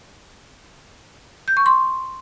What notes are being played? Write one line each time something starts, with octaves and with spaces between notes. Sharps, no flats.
G6
C#6
C6